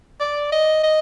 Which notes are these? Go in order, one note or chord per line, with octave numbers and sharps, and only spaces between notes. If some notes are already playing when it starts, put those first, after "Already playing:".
D5
D#5
D#5